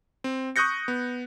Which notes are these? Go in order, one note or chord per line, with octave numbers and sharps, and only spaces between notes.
C4
C#6 D#6 F#6 G6 A#6 C#7
B3